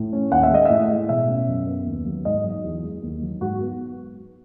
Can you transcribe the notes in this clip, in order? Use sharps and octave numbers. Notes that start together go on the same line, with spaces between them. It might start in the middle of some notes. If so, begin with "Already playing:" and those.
Already playing: A2
C#4
D#2 F#5
E5
G#3 D#5
A2 E5
G#3
B2 E5
C#4
F#2
B3
D#2
F#3
G#2 D#5
F#3
E2
G#3
D#2
F#3
G#2 F#4
B3